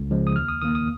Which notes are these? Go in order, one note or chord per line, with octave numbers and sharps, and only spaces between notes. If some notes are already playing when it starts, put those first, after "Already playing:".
Already playing: C#2
C#3 F3 G#3
D#6
D#2 F6
D#6
D#3 A#3 D#6
D#6